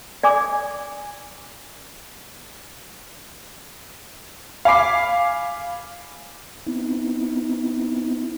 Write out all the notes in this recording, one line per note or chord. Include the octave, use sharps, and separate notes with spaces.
D5 G#5 D6
F5 G#5 B5 D6 C7
B3 C4 D#4 E4